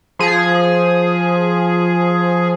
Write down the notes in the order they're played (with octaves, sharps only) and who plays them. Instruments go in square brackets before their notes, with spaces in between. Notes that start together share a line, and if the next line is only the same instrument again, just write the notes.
[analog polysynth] F3 G#4